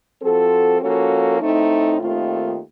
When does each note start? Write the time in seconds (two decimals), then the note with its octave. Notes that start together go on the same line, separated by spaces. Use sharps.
0.21 F3 C4 F#4 A4
0.80 F3 A#3 C#4 F#4 A4
1.40 A2 A3 C4 D#4
1.99 D#2 D#3 A3 C4 F4